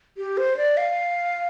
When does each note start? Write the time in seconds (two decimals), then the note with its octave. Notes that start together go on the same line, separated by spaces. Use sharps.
0.17 G4
0.37 C5
0.57 D5
0.77 F5